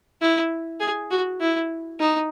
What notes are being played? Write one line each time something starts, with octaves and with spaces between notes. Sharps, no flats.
E4
G#4
F#4
E4
D#4